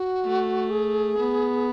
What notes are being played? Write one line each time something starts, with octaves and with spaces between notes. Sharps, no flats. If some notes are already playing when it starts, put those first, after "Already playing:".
Already playing: F#4
A3
G#4
B3